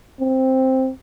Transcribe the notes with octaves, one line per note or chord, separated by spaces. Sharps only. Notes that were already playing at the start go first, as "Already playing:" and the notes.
C4